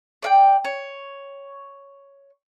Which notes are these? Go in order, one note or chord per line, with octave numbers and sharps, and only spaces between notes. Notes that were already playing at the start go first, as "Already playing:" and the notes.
D5 F5 G5
C#5